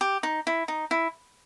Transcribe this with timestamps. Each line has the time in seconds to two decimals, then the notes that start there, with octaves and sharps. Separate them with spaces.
0.01 G4
0.23 D#4
0.47 E4
0.68 D#4
0.91 E4